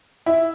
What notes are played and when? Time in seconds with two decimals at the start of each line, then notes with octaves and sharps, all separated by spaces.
0.26 E4